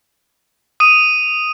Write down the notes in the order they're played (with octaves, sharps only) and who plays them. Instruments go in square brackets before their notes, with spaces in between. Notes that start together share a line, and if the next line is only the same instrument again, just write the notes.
[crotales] D#6 D#7